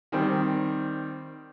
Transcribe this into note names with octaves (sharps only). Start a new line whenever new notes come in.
D#3 G3 C4